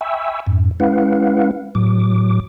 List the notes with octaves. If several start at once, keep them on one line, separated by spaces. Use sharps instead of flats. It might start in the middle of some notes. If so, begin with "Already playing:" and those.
E5 G5 G#5 B5 C#6 E6
F2 G#2
G#3 C#4 E4 B4 F5 F#5
A2 F#3 D6